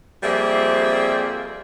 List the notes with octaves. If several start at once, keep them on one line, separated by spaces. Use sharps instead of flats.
F2 G3 A#3 C4 G#4 E5